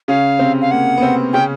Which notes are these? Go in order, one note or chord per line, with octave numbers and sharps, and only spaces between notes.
C#3 C#4 F5
C3 C4
F5
A#3 F#5
B3
C3 C4
C#3 C#4 G5